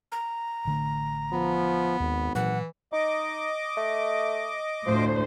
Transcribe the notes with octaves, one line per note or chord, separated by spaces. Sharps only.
A#5
A1 D3 A3
F3 B3
G#1 D#2
A#2 E3 F#3 F#5
D#4 D#5 D6
A3
D2 A2 F3 C5